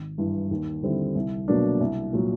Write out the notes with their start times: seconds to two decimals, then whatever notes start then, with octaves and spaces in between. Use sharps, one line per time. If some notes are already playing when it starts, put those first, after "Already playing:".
Already playing: G#1
0.18 G2 E3
0.51 D#2
0.83 D3 G3 C4 E4
1.15 C2
1.48 B2 F#3 A#3 D4
1.80 C2
2.13 A#2 F#3